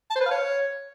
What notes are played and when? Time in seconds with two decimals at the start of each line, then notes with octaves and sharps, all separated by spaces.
0.10 A5
0.16 C5
0.21 B4
0.26 F5
0.31 C#5